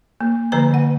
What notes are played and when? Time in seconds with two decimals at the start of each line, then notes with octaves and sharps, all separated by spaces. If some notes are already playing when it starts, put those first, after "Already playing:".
0.21 A#3
0.52 D3 F3 A#3 B4 A#5
0.71 D3 F#5